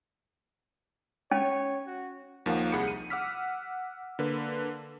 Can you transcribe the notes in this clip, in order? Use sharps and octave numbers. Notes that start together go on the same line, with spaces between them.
C#4 C#5
F#4
D#2 D#3 F3 A#3 F5 F#5
C2 G#4 F#5 B5 C#7
D#7
F#5 D6 E6 F6 B6
D3 A#3 B4